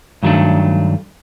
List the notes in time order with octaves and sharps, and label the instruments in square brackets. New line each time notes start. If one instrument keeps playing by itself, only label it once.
[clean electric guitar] G2 D#3 F#3 A3 D4